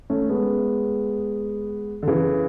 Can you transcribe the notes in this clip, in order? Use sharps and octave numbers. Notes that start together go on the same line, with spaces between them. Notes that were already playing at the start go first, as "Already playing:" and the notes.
A3 C#4
G#3 B3
D3
C#3 E3